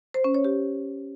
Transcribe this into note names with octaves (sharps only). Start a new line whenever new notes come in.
C5
C#4
C#5
G4